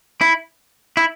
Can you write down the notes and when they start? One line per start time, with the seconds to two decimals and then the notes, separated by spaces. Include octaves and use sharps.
0.21 E4
0.97 E4